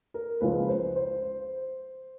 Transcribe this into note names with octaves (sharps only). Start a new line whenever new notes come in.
A#4
C#2 C#3 F3 G#3 B4
C5
C5